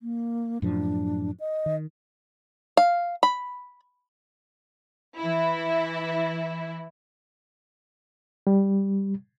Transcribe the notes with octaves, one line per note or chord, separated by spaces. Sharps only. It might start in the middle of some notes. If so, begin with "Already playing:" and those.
A#3
F#2 A2 F3 D4
D#5
D#3
F5
B5
E3 E4
G3